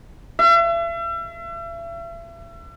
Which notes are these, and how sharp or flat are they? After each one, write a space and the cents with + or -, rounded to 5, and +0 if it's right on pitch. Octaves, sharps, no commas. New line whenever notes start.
E5 +40